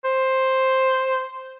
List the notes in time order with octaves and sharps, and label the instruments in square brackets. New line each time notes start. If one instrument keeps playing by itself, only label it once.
[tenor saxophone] C5